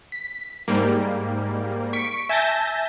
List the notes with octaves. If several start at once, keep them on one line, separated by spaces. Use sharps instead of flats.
B6
G#2 G3 A#3
C#6 B6 C#7 D7
E5 G#5 A5 G6 A6 A#6